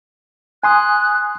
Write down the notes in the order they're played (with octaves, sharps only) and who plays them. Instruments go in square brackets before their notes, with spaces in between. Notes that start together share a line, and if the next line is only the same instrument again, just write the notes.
[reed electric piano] G#5 C6 D#6 [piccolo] F#6